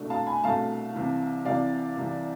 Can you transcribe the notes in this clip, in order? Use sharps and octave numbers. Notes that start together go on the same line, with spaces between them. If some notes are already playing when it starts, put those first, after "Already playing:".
Already playing: C2 B2 A3 D4
F5 A5
G#5 B5
C2 B2 A3 D4 F5 A5
C2 C3 E3
C2 C3 E3 D5 F5
C2 C3 E3